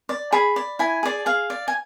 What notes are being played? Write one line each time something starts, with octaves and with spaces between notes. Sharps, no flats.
D5
G#4 B5
D5
E4 G#5
G#4 D5
G#4 F5
D5
G#5